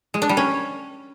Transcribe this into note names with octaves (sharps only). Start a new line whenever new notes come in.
G#3
D4
G3
C#4